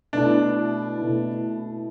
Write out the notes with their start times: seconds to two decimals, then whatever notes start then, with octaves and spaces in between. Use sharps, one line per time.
0.13 B2 A3 D4 E4
0.98 B2 A3 E4